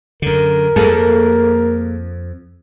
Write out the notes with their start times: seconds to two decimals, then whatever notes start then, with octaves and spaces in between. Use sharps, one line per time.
0.22 F#2 D3 A#4
0.76 F2 A#3 G#4 A4